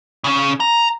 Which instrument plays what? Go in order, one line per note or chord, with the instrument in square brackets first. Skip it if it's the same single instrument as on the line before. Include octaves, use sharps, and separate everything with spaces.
[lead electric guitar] C#3 C#4
A#5